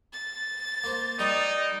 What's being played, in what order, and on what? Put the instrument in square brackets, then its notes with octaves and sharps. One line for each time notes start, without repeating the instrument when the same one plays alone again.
[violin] A6
[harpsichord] A#3 C5
[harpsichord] G3 D#5 [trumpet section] A#3 D#4